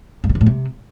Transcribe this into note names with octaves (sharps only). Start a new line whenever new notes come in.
G2
B2
D3
A2
C3